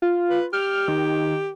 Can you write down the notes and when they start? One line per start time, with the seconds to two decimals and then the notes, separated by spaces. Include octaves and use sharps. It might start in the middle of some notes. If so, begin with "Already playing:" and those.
0.02 F4
0.29 B4
0.53 G4 F6
0.88 D#3